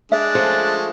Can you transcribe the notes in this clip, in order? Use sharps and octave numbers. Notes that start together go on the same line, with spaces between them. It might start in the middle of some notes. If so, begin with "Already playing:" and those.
G#3 D4 E5
F3 A3 C#4